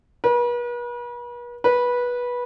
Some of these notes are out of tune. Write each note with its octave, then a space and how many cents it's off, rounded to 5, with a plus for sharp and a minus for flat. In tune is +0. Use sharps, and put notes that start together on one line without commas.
B4 -40
B4 -15